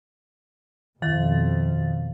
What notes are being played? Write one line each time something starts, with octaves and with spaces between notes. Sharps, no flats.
F2 B2 D#3 F5 A6